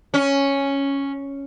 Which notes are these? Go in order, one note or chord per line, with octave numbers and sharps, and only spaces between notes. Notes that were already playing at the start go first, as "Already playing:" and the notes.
C#4